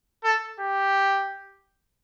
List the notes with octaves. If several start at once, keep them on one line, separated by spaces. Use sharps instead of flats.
A4
G4